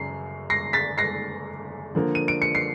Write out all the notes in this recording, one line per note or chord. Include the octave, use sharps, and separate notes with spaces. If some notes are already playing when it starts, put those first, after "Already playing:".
Already playing: F#2 C#3 C7
A#6 C7
A6 B6
A#6 C7
D3 F3 A#3
D#7
D7
C#7
C7